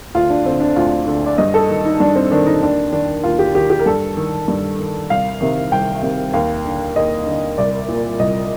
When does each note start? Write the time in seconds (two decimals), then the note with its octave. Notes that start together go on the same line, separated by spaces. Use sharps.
0.14 D2 F4
0.30 D4
0.45 D3 C4
0.60 D4
0.76 D2 F4
1.07 D3
1.26 D5
1.38 G2 D#5
1.54 A4
1.69 D#3
1.85 D#4
2.00 G2 D4
2.16 C4
2.32 D#3 D4
2.46 D#4
2.62 D#2 D4
2.93 D#3 D4
3.23 D#2 F4
3.39 G4
3.55 D#3 G4
3.70 G4
3.79 A#4
3.86 G2 A4
4.17 D#3
4.48 G2
4.79 D#3
5.10 C2 F5
5.41 C3 D#3
5.72 C2 G5
6.03 C3 D#3
6.33 D#2 F5
6.65 D3
6.96 D#2 D#5
7.26 D3
7.58 C2 D5
7.88 A#2
8.19 C2 D#5